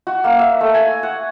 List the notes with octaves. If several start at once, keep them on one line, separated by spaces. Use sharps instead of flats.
F#4
A#3
E5
A3
G#5
F#5